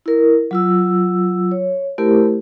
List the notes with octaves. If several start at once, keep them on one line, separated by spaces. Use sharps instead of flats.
E4 A#4
F#3 F4 E6
C#5
A3 E4 G4 A#4 C5